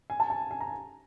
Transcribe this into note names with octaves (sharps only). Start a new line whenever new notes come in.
G#5
A5
A5
G#5
A#5